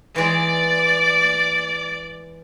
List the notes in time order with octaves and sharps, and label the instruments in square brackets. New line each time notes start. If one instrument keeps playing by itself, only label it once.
[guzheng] E3 G#3 [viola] D5 D6